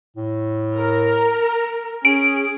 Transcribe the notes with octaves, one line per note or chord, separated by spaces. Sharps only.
A2
A#4
C#4 G#4 D7